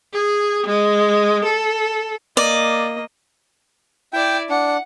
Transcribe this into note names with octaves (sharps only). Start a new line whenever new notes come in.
G#4
G#3
A4
A#3 D5 D#5
E4 D5 G5
D4 F#5